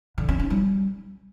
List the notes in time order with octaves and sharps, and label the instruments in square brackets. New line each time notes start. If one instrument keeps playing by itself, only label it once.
[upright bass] D3
C#4
D#4
G3